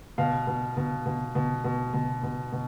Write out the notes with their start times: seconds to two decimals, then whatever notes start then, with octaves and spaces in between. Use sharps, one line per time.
0.18 B2 F5
0.47 B2
0.77 B2
1.06 B2
1.35 B2
1.64 B2
1.94 B2
2.23 B2
2.52 B2